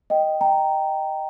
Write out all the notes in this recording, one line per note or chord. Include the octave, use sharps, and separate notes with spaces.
D#5 G5
G5 A#5